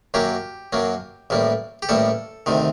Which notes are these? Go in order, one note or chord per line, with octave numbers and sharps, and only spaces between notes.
F#2 F#3 A#3 G4
F#2 F#3 A#3
A1 A2 G3 A#3
G4
A1 A2 G3 A#3 A4
D2 C3 D#3